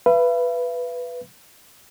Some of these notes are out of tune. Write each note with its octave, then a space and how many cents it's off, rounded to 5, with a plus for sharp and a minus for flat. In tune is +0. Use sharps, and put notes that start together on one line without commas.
B4 +0 E5 +45